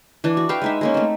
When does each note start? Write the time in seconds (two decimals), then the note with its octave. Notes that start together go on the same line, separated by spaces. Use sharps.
0.24 E3 D4
0.37 F#4
0.49 B4 E5 F5 G5
0.62 G#3 D#4 E5
0.81 G#3 A#3 C#4
0.94 A3 C4